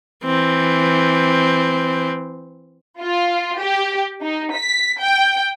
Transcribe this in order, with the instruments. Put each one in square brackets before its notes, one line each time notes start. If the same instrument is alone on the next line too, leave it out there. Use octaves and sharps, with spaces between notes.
[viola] E3 C4
[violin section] F4
G4
D#4
B6
G5